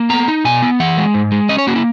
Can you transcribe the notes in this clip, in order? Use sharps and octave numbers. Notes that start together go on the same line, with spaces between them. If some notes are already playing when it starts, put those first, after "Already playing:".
Already playing: A#3
B3 A#5
D#4
B2 G#5
B3
E3 F#5
G#3
G#2
G#3
C#4 D#5
C#5
A#3 F#4
E4